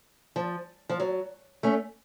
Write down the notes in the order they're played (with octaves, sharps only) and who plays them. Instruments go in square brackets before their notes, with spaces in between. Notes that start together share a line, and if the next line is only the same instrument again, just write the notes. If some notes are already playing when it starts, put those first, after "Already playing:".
[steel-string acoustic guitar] F3
F3
F#3
A3 C#4